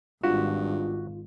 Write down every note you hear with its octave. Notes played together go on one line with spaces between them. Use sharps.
G#1 G2 F4 F#4